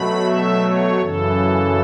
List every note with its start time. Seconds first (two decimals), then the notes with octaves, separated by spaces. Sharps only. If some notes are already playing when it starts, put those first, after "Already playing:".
Already playing: B2 F#3 A3 B5
0.23 E5
0.62 C#5
1.00 F#2 C#3 E3 A4